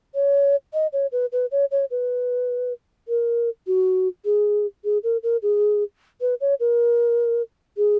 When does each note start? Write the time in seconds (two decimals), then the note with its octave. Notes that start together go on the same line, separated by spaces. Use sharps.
0.15 C#5
0.73 D#5
0.93 C#5
1.12 B4
1.32 B4
1.52 C#5
1.71 C#5
1.91 B4
3.08 A#4
3.67 F#4
4.25 G#4
4.84 G#4
5.04 A#4
5.23 A#4
5.43 G#4
6.21 B4
6.41 C#5
6.60 A#4
7.77 G#4